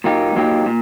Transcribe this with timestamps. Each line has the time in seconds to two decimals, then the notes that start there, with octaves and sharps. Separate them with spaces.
0.04 A#2 F#3 A#3 D#4 G4
0.36 A#2 F#3 A#3 D#4 G4
0.66 A#2